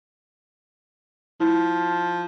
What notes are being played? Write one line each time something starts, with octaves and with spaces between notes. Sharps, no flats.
F3 E4